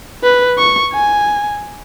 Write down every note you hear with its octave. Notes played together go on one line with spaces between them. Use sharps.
B4
C#6
G#5